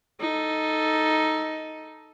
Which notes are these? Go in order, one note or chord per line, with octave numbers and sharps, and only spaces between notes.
D#4 A4